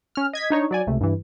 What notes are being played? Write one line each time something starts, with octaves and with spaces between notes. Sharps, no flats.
C#4 F6
D#5 G#6 B6
D4 D#4 C#5
F#3 D5 G#5
C#2 C3 A3
G2 E3